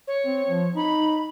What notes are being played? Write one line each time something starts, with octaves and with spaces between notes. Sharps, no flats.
C#5
C4
F3
D#4 B5